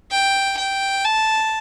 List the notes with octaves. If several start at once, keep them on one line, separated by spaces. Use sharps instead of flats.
G5
G5
A5